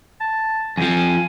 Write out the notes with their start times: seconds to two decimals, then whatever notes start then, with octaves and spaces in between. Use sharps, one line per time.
0.21 A5
0.78 F2 F3 G#5